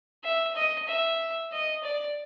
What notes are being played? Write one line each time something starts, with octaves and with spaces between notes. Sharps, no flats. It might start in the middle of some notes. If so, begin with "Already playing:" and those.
E5
D#5
E5
D#5
D5